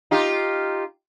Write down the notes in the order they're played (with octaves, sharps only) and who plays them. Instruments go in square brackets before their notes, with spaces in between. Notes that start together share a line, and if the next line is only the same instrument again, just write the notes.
[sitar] D#4 F4 G4